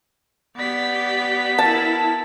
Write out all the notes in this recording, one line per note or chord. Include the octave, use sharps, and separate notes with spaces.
B3 G4 D5 B6
E4 A#4 A5